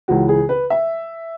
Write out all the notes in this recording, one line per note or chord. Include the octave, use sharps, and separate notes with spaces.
C#2 C#3 E3 F#4
G#4
B4
E5